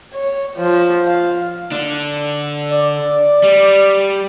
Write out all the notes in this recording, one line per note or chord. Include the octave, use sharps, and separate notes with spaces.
C#5
F3
F5
D3 D4
D5
G3